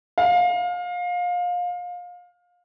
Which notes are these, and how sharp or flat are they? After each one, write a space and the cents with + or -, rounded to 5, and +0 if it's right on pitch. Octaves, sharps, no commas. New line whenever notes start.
F5 +25